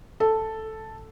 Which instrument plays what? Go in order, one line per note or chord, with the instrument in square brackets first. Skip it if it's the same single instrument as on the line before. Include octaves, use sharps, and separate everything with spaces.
[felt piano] A4